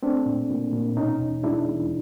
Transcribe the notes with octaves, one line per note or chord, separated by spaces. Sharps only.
A3 C4 D4
A#2
A#2
A#2
B2 C#4 D#4
E2
G#3 D4 E4
E2